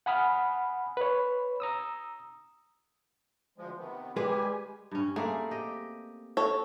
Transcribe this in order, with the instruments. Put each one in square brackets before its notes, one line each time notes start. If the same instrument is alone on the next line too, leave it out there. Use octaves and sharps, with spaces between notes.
[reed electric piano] F#5 G#5 B5 D#6 F6
B4 C#5
A#5 D#6 E6
[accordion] D2 F3 G#3
C3 D#3 B3
[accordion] G3 G4 G#5 [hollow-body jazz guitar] G#3 G#4 B4
[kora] G2 C#4
[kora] A3 A#3 C4 [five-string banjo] G#4
[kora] G4 D#5
[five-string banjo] A4 C#5